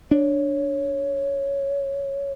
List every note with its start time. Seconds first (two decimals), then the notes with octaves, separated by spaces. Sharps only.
0.11 D4 C#5